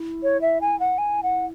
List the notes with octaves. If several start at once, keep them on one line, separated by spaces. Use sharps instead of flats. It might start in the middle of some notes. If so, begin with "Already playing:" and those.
Already playing: E4
C#5
E5
G#5
F#5
G#5
F#5